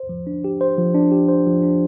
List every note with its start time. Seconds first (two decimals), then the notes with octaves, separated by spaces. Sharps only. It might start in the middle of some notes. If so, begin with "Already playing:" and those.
Already playing: C5
0.09 F3
0.27 D4
0.44 G4
0.61 C5
0.78 F3
0.94 D4
1.12 G4
1.29 C5
1.46 F3
1.62 D4